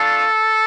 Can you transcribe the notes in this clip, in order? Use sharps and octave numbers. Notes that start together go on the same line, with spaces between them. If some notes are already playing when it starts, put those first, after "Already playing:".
Already playing: A3 D4 F4 A4